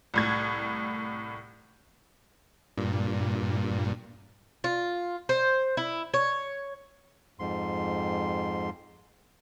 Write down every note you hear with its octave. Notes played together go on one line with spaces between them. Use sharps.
C2 A2 G#6
G2 A#2
F4
C5
E4
C#5
F2 G#2 C6